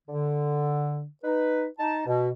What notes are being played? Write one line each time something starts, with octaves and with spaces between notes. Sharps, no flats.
D3
D#4 B4
D#4 A5
B2